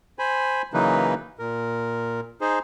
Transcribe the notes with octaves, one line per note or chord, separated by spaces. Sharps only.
C5 G#5 B5
C#3 E3 F#3 A#3 D#4 B4
A#2 A#4
D#4 G#4 C5